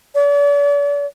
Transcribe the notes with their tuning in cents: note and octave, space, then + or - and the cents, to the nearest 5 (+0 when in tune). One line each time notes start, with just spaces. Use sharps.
D5 -40